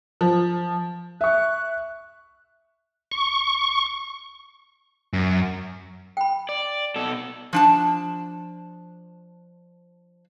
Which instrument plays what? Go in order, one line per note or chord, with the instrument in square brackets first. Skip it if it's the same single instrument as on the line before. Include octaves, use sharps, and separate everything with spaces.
[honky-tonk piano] F3
[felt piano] E5 C#6 [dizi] F#6
[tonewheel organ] C#6
[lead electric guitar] F#2
[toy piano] G5 B5
[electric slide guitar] D5
B2 A4
[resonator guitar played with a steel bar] F3 D4 A5